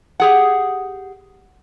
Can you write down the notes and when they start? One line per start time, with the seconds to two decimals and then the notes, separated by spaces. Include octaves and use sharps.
0.20 G4 G#4 F#5